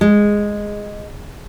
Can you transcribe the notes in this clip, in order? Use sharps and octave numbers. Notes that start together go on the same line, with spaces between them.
G#3